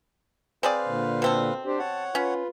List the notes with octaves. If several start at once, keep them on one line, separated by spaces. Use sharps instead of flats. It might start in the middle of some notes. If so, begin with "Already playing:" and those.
C4 G#4 B4 C5 D5 F5
A#2 D3
B2 C4 A4
D4 G4 C5
C#5 F#5 A5
C#4 F4 B4